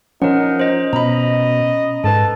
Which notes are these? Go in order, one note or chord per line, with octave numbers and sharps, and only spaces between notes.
F3 C#4 D#4 A#4 F#5
C5 D#5
B2 D#5 A#5 B5
G#2 A4 B4 A5